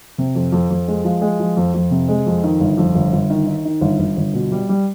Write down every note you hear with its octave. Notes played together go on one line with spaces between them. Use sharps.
C3
F2
F2
F2
G#3
F3
G#3
F3
F2
F2
C3
G#3
F2
D#3
G1
F2
G1
G1
D#3
D#3
D#3
G1
G1
G1
B2
G3
G3